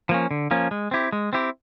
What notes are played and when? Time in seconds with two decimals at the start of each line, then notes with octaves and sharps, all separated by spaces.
0.09 F3 A#3 C#4
0.31 D3
0.51 F3 A#3 C#4
0.71 G#3
0.91 C4 E4 G4
1.12 G#3
1.33 C4 E4 G4